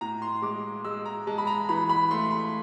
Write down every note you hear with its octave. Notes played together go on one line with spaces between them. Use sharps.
A2 A#5
C6
G#3 D6
G#3 E6
A#5
G#3 A5
B5
A#5
E3 B5
B5
A3 C6
B5